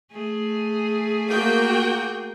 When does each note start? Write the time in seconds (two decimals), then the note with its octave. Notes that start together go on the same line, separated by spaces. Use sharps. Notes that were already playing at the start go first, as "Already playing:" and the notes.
0.11 A3 G#4
1.29 A#3 F#4 G5